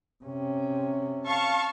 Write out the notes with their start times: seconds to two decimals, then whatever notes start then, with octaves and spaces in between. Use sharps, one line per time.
0.25 C3 C#4
1.27 F5 A5 C#6